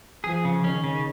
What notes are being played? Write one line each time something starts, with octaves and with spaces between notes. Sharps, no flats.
F3 G#4
C#3
D#3 C#4
C#3